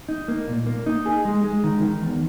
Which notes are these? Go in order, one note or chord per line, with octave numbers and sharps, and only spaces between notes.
D#4
A#3
A#2
A#3
D#4
G#4
G#3
G#3
D#3
D#3
E2